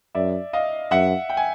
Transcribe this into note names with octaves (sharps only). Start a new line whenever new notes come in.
F#2 D5 E5
D#5 F5
F#2 E5 F#5
G5
G#5